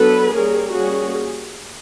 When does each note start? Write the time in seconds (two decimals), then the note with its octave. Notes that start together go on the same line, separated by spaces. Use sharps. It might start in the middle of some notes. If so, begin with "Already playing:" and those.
Already playing: F#3 B3 D4 A4 B4
0.33 G3 A#3 C#4 G#4 A#4
0.73 G3 A#3 C#4 F#4 G#4